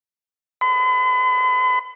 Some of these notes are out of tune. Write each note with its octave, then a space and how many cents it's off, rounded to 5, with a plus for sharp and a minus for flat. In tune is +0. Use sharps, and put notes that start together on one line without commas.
B5 +40